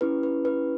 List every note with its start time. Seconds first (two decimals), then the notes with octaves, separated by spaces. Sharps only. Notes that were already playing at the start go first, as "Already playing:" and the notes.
0.01 C#4 E4 G4 B4
0.23 B4
0.45 B4